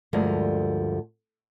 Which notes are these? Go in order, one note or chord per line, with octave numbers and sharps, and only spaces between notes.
D2 G2 F3 G#3 A#4